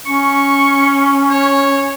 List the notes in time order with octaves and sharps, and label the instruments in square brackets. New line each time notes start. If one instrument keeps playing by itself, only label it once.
[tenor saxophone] C#4 [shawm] C#6
[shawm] C#5